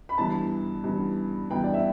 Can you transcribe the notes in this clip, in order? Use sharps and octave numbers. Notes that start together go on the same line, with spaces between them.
B5
G2 E3 B3 A5
G2 E3 B3
G2 E3 B3 G5
D5
E5